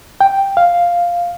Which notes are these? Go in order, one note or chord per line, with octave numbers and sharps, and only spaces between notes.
G5
F5